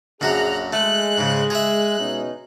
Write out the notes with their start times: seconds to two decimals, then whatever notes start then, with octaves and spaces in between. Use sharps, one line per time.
0.21 A#1 F#2 F#4 G#4 A#5 F#6
0.73 G#3 A3 F#6
1.18 G#2 C#3
1.50 G#4 E5 F#6
1.99 B2 C#4 D#4